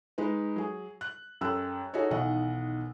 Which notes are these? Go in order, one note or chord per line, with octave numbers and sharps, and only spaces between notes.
G#3 D#4 B4
F#3 G#4
F#6
F#2 G4 A4 G5 E6 F#6
D#4 F#4 G#4 A4 C#5 D#5
B1 D#3 E3 D#5 F#5